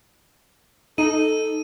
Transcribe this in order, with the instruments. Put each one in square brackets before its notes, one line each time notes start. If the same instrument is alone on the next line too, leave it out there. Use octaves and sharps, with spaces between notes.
[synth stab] D#4 [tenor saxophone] A4 [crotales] D#7